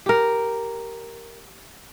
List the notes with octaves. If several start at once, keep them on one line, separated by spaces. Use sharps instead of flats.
G4 A#4